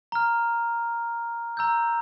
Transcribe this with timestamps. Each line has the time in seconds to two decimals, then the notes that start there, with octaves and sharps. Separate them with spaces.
0.12 A#5 F6
1.57 A#5 E6 G6